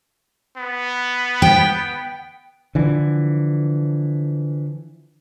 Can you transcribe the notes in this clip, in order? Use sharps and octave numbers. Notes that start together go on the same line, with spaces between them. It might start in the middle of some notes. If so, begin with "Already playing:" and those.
B3
G5
D3 E3 F3